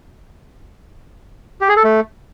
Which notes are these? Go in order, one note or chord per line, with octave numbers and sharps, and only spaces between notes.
G4
G#4
A4
A3